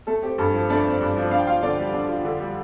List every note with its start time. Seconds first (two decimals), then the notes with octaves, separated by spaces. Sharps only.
0.07 A3 A4
0.23 C4 G4
0.38 G2 A4
0.54 F3
0.70 A3 D4 D5
0.85 C4
1.01 G2
1.16 F3
1.31 D4 F5
1.40 G5
1.47 F4 F5
1.63 D3 D4 D5
1.78 G3
1.94 D4
2.09 F4
2.25 D3
2.40 G3